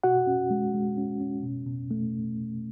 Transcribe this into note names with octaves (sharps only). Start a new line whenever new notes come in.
B2 F#4 F#5
C#4
G#3
G#3
C#4
C#4
B2
B2
A3